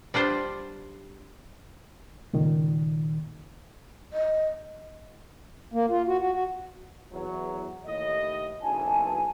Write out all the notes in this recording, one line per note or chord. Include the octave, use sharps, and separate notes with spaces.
G3 D4 F4 C5
C#2 A#2 D#3
D#5
A#3
F4
F#4
F#4
F#4
E2 F#3
D#2 A2 D#5
F#1 B1 E3 G#5 A5